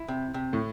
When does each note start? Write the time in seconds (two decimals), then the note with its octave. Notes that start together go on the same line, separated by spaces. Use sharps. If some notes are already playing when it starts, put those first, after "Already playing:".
Already playing: E4
0.08 C3
0.34 C3
0.53 A2